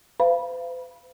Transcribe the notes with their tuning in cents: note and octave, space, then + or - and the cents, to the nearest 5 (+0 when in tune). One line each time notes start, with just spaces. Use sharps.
C5 -45 F5 -25 B5 -25